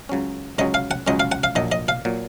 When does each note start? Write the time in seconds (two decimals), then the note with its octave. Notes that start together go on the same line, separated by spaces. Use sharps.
0.09 C#2 C#3 F#3 C#4
0.58 C#2 C#3 F#3 C#4 D#5
0.74 F5
0.91 F#5
1.06 C#2 C#3 F#3 C#4 D#5
1.20 F5
1.32 F#5
1.44 F5
1.55 A#1 A#2 F#3 D#5
1.72 D#5
1.88 F5
2.05 A#2 F#3